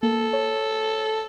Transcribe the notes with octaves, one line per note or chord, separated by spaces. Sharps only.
A#3 A4
C#5